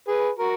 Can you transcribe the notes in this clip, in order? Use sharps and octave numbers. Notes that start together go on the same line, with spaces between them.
G#4 B4
F#4 A#4